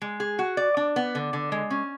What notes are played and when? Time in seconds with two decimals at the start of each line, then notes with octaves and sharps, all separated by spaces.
0.02 G#3
0.20 G#4
0.39 F#4
0.57 D5
0.77 D4
0.96 B3
1.15 D3
1.33 D3
1.52 G#3
1.71 C#4